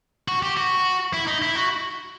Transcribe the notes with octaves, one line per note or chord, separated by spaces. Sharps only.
F#4
G4
F#4
E4
D#4
E4
F#4